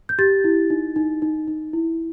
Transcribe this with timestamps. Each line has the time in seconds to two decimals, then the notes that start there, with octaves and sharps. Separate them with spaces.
0.09 G6
0.19 G4 A6
0.44 E4
0.70 D#4
0.96 D#4
1.22 D#4
1.48 D#4
1.73 E4